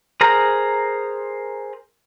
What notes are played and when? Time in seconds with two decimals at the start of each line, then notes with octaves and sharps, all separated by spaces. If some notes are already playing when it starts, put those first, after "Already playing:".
0.21 G#4 A#4 C5 A#5